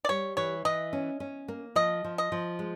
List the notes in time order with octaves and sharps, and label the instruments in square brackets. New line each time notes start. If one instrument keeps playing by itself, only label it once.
[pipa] D5
[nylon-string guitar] G3 [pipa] C#5
[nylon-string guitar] E3 [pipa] C#5
[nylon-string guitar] E3 [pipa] D#5
[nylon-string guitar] C#4
C#4
A#3
[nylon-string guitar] F3 [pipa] D#5
[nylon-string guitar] F3
[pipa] D#5
[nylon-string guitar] F3
G#3